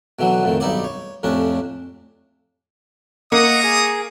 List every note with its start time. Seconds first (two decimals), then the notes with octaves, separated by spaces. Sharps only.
0.19 B2 D3 E3 F#3
0.43 F2 A2 D#3
0.60 B1 G2 D#4 E4 D5 D6
0.84 C#5
1.23 F2 A2 C3 C#4 D4
3.32 A#3 D#5 F#5 A#5 C#6 D#6
3.63 G#4